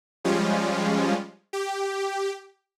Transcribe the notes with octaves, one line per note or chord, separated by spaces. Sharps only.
F3 G3 G#3 C#4 F4
G4